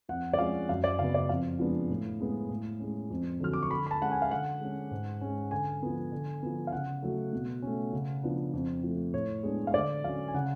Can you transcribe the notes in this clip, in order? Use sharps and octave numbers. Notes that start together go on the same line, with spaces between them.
F2 F#5
D5
F3 G#3 C#4 F5
F#2 F5
D5
C#3 F#3 B3 F5
D5
F2 F5
F3 G#3 B3 D4
A2
G#3 B3
A2
G#3 C#4
F2
D3 F#3 F6
D6
C#6
D3 B5
B5
A5
G#3 C#4 F#5
G#5
F5
D3 F#5
G#3 C#4
G#2
G#3 C#4
D3 G#5
F3 B3
D3
F3 B3
F5
C#3 F#5
F#3 A3
B2
A3 C#4
C#3
F3 B3 D4
F2
F3 A3
A2 C#5
G#3 B3 D4
F5
D3 D5
F#3 C#4 F5
G#5
C#3 F#5